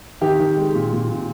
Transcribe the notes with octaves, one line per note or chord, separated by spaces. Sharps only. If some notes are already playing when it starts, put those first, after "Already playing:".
D#3 G4
D#3
G#3
A#2
A#2
A#2